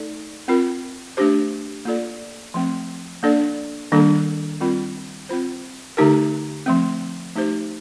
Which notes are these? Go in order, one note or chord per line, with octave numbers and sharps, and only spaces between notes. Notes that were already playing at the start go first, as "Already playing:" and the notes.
Already playing: A3 D#4 A4 D5
C4 F4 A#4
A3 D4 G4 C5
A#3 F4 A4 D5
F3 A3 C4
A#3 D4 A4 D5
D#3 G3 A#3 D4 A4
G3 C4 F4 A#4
C4 F4 C5
D3 A3 D#4 G4 A#4
F3 A3 C4
A3 D#4 G4 C5